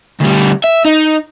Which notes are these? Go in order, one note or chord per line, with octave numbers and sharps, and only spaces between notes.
D2 G3
E5
D#4